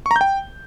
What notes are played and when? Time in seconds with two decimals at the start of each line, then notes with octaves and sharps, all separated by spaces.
0.06 C#6
0.11 A#5
0.16 G6
0.21 G5